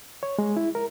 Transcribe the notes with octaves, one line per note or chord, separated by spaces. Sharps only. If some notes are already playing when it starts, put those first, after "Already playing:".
C#5
G#3
E4
A#4